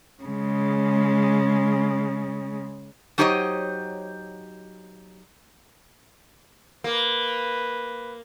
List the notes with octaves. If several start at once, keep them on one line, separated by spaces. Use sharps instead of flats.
C#3 G#3
F#3 D#4 G4 C5 C#5 D#5
A#3 B4